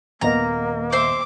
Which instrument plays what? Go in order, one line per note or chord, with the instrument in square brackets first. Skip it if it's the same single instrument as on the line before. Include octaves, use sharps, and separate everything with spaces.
[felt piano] D#1 B3 D#5 [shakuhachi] A#3 [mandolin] A#5
[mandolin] C5 E5 C6 [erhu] D6